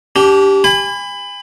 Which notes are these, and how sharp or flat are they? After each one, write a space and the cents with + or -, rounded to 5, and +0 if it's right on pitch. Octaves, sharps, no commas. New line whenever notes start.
D4 -30 G4 +0
G#5 -35 B5 +20